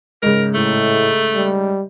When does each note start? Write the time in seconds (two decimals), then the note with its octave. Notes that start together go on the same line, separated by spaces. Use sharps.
0.23 G#2 C#3 A#4
0.55 A2 A3
1.34 G3